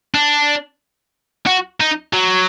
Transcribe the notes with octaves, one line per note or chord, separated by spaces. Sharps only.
D4
F#4
D#4
F#3